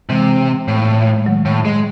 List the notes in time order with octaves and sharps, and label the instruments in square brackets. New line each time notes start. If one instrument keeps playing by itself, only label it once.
[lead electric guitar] C3 [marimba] E3 G#3
[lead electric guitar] A2
[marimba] A3
G#3
D#3 F#3
[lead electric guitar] A2
G#3